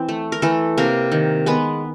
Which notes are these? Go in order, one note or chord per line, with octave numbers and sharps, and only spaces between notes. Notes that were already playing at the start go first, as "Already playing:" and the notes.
Already playing: E3 C4
A3
A#4
E3 A3 A4
C3 A#3 A#4
D#3
G#3 B3 B4